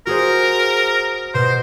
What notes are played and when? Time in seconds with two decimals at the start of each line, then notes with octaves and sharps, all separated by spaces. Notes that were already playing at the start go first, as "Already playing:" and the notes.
0.07 F#4 G#4 A#4 C5
1.34 B2 C5